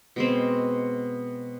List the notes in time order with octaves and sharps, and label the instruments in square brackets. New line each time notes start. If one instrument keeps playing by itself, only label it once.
[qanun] B2 G#3 C4